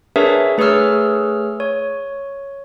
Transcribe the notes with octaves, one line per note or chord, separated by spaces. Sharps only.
D4 G#4 A#4 B4 C#5 E5
A3 G#4 B4 C#5 E6 F6
C#5